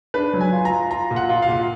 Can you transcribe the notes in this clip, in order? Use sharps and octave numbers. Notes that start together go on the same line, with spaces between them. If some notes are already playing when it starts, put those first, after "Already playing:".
D4 B4
F#3
G#5
F4
A#5
F4
F4 A#5
A#2
F#5
F4
F5
A#2